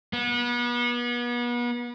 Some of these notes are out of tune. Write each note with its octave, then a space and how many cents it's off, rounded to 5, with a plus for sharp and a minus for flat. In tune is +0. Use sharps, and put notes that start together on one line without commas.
B3 -35